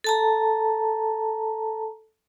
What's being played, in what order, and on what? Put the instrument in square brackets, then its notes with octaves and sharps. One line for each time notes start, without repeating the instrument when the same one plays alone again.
[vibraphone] A4 A5 A#5